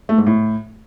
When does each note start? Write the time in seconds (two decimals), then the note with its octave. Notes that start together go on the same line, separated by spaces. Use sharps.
0.09 A3
0.18 G#2
0.27 A2